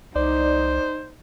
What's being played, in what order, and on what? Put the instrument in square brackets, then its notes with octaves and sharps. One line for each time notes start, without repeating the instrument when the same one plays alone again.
[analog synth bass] C2 [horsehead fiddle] D#4 [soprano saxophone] C5 [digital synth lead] D5